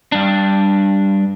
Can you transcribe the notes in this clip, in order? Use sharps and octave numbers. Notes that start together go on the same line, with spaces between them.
G2 D4